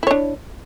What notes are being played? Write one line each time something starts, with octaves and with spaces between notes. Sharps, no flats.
D4 E4 C#5